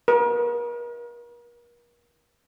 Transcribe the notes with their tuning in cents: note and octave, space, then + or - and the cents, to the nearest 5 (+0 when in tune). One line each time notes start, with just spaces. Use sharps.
A#4 +40